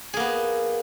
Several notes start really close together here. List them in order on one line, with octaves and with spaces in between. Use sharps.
G#4 A#3 B3